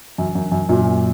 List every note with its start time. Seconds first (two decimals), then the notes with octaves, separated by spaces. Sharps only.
0.18 F#2
0.35 F#2
0.51 F#2
0.69 F#2 A#2